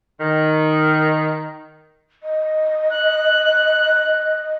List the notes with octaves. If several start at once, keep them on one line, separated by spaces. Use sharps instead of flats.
D#3
D#5
F#6